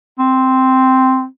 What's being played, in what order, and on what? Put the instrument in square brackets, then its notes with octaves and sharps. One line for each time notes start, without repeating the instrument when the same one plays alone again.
[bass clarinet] C4